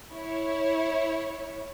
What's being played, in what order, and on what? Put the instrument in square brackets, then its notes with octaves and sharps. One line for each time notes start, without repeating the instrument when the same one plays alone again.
[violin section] E4 C#5